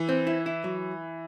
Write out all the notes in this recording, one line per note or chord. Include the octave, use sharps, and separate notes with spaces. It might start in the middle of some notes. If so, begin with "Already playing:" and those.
Already playing: E3
C4
E4
E4
F#3